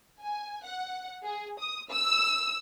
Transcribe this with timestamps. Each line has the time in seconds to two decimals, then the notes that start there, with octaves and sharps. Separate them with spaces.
0.21 G#5
0.65 F#5
1.24 G#4
1.59 D#6
1.90 E6